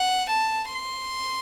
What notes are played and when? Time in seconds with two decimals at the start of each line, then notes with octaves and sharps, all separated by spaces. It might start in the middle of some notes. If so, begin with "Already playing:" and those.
Already playing: F#5
0.30 A5
0.75 C6